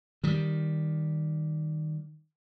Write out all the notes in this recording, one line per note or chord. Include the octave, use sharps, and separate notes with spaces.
D#3 G3